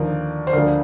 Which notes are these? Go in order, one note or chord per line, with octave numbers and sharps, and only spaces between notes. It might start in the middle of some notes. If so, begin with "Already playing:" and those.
Already playing: D#2 D3 F3 A#4 D5
C5
D2 D3 F3 A#4 D5